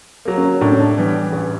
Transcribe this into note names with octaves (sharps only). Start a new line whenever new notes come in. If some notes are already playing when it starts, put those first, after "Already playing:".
F#3 A#3
C#4
A2 D4
C#4
D4
E3 G3 B3
A1